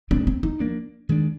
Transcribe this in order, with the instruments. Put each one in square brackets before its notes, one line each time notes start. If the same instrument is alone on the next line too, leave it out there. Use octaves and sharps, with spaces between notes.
[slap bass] A#2 G#3 D4 [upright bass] C4
[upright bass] C4
D#4
[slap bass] F3 A#3 D4
D#3 G#3 D4